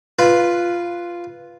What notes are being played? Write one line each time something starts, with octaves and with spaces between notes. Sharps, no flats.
F4 B4